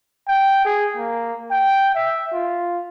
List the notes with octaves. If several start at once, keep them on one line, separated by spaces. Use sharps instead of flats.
G5
G#4
A#3
G5
E5
F4